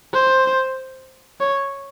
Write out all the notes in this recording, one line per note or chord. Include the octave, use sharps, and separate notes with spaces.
C5
C#5